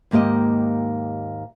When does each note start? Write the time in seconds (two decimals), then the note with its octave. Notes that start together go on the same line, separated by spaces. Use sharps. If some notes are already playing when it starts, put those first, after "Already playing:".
0.11 D#2 G#2 A#3 G4 D#5